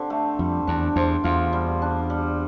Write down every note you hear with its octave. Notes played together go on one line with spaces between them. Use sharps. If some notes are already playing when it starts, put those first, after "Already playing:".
Already playing: D3 C4 G4
A3
F2 G3
E2 D4
E2 C5
E2 F4
G3
D4
G3